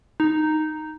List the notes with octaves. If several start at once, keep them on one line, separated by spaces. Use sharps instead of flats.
D#4